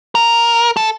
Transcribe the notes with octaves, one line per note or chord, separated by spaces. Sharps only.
A#4
A4